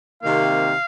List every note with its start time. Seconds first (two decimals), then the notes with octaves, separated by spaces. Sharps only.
0.23 C3 D#3 A#3 F5